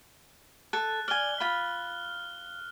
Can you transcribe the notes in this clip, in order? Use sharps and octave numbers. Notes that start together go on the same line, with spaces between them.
A4 F#6
D5 G#5 F6 G7
F4 B5